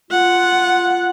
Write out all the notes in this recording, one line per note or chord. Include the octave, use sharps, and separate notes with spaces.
F4 F#5